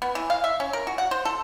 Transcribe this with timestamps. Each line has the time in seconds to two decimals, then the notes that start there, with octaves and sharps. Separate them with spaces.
0.02 B3
0.15 E3
0.30 F5
0.44 E5
0.60 C#4
0.73 A#4
0.87 F#4
0.98 F#5
1.11 C5
1.25 A4